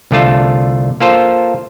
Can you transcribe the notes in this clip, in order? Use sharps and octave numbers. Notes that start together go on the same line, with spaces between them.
C2 D3 A3 F4 A5
A#3 F4 A4 C5